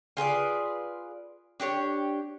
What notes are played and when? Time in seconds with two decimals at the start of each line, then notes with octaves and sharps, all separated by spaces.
0.17 F4 G#4 B4 D5
1.60 D4 G4 C5 C#5